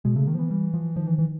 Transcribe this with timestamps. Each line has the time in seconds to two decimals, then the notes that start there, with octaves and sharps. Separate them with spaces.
0.05 B2 G#3
0.16 C#3 A3
0.27 D#3 A#3
0.35 F3
0.39 E3 B3
0.51 G3
0.74 F3
0.96 D#3 F3
1.07 E3
1.18 E3